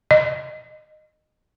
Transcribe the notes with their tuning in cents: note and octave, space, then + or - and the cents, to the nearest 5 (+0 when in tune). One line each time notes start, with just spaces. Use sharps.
D#5 -15